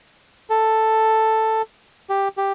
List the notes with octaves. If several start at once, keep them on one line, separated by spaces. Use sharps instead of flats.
A4
G4
G4